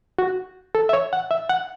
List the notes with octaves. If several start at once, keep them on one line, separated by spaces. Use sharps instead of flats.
F#4
A4
E5
C#5
F#5
E5
F#5